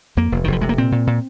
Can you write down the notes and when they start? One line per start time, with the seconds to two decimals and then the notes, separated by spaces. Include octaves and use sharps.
0.17 F2 A#3
0.32 F1
0.44 D#3
0.48 F1 F3
0.61 C3 G#3
0.69 A#3
0.78 A#2 C4
0.92 A#2
1.07 A#2